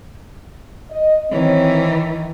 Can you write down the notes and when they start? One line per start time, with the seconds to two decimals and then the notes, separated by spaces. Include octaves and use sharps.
0.91 D#5
1.31 D#3 E3 C4 C#5